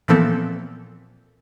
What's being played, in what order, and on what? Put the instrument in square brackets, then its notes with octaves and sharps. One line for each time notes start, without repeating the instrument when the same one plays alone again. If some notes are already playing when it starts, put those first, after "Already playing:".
[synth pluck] A#2 E3 F3 B3 C4 A4